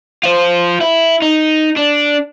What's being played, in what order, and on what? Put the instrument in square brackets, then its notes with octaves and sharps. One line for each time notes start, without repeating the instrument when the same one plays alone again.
[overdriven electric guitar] F4 C5
E4
D#4
D4